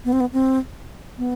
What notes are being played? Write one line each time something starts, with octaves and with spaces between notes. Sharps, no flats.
B3
C4
B3
C4
B3